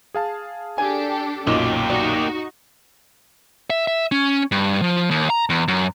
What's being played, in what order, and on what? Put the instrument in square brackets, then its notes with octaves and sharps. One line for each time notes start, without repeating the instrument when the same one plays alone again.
[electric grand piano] G#4 F5 A5
[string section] D4 G4 A4 [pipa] G#5
[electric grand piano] B1 F#2 A#2 [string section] F#3 [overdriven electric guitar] A#3 G4 [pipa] D#4
[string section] D#4 F#4 [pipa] D5
[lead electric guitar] E5
E5
C#4
G2
F3
D#2
A#5
E2
F#2